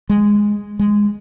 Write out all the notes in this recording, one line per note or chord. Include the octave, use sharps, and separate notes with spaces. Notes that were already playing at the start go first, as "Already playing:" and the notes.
G#3
G#3